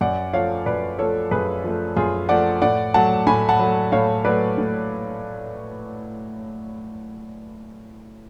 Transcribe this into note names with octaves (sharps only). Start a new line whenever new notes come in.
F#2 D5 F#5
F3 A3 C#5 F5
F#2 B4 D5
F3 A3 A4 C#5
F#2 G#4 B4
F3 A3
F#2 F4 G#4
F3 A3 D5 F#5
A2 D5 F#5
F#3 A3 F#5 A5
A2 G#5 B5
F#5 A5
F#3 A3
A2 C#5 F5
F#3 A3 B4 D5
A2